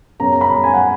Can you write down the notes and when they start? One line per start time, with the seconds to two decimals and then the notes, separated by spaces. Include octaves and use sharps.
0.19 F#2 C#3 F#3 B3 A#5
0.41 B5
0.64 G#5
0.74 F#5